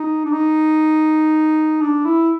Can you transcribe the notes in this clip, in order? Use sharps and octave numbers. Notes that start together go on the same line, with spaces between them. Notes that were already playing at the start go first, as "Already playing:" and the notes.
Already playing: D#4
D4
D#4
D4
E4